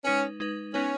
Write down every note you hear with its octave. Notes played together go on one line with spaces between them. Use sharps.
G#3 C#4 D#4 B4
G#3 D#4 B4
B3 C#4 D#4 B4